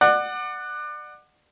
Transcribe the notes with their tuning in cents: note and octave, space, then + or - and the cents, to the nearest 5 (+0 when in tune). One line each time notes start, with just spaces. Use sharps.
D5 +30 F#5 +0